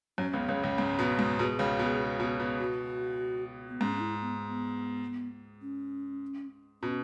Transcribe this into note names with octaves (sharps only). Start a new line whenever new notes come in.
F#2 F#3 C#4
C#2 C#3
B3
C#2 C#3 C#4
C#2 C#3
G#2
B2
G#2
B2 G#4
C#2 C#3
B2
B2
B2
F#4
B3
G#2 C#4
C#4
E4
B3
B3
C#4
B2 C#4